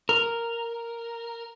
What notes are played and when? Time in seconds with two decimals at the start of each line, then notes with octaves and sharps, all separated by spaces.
0.09 A#4